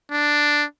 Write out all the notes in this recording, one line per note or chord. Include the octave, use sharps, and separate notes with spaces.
D4